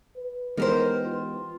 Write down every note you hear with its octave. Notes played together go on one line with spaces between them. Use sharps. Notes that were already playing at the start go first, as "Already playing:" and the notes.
B4
E3 G#3 B3 D#4 G4 A#4 C5
F4